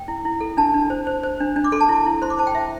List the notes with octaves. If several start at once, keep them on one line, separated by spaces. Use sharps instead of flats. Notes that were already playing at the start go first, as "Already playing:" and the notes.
Already playing: G5
E4
E4
A4
D4 A5
D4
C5
C5
C5
D4
D4
D6
A4 C6
A5
E4
E4
C5 C6
D6
C5 A5
G5
C5 E5